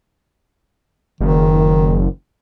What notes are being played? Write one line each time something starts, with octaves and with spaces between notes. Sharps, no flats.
F#1 D#3